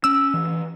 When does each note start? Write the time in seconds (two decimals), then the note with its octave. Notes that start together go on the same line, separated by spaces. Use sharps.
0.04 C#4 E6
0.34 E3